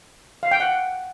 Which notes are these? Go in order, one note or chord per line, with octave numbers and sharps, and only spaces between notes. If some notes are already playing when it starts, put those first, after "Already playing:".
F5
G5
F#5